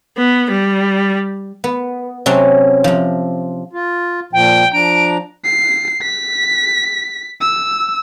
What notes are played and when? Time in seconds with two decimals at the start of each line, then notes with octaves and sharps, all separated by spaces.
0.18 B3
0.51 G3
1.64 B3
2.26 C3 F#3 C4 C#4 A5 C6
2.84 C3 F3
3.73 F4
4.33 A#2 F3 G5
4.73 F3 D4 A#5 D7
5.44 C7
6.02 B6
7.41 E6